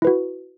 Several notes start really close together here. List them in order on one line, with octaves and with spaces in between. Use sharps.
E4 B4 F#4